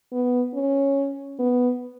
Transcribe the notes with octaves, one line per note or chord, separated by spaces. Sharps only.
B3
C#4
B3